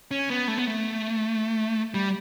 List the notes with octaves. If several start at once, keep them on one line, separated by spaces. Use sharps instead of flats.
C#4
B3
A3
B3
A3
G3